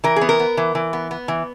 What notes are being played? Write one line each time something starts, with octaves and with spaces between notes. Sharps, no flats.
E3 A#4
G#4
B3
A#4
B3
E3
E3
B3
B3
E3